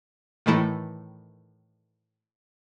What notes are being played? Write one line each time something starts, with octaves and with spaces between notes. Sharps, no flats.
A2 D#3 E3 A3 E4